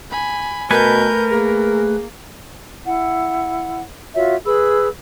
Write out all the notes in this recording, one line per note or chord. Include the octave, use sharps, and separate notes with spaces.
G#5 B5
B2 A3 A#4 B4 G#5 G6
A#3 G#4
E4 F#5
F4 F#4 C#5 E5
G#4 B4 B5 E6